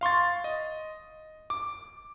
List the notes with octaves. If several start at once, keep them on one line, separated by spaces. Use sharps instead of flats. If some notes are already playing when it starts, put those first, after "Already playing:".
F5 C6 C#6 A6
D#5
D6